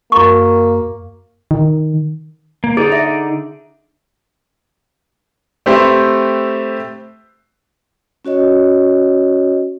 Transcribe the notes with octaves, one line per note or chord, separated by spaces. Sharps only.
F#2 A#3 A#4 A#5 C#6
D#3
A#3
D3 D#4 G#4 D5
E5
A3 C4 G4 B4 C5 E5
C#4 F#4 C#5 D#5